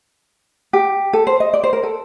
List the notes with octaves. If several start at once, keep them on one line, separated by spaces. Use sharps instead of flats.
G4
A4
C5
D#5
D5
C5
A#4
A4